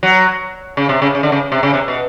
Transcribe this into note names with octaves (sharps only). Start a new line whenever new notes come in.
F#3
C#3
C3
C#3
C#3
D3
C#3
C3
C#3
C3
B2